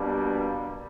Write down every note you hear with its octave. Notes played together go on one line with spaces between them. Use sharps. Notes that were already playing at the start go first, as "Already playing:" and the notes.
Already playing: B2 G3 A#3 D4